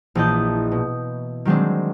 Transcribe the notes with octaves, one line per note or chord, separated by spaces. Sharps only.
A#1 E3 E4 D#5 A5 G6
B2
D#3 F#3 G#3 C4 D4